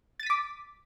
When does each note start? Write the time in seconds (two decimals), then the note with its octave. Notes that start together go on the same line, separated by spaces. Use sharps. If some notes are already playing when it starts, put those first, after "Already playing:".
0.20 A6
0.23 D#7
0.26 B6
0.30 D6